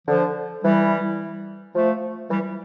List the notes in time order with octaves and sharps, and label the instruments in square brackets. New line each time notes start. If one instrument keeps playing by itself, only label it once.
[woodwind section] D3 F3
E3 G3
F3 A3
E3 G3